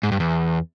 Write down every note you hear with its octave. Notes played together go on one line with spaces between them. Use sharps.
G#2
G2
E2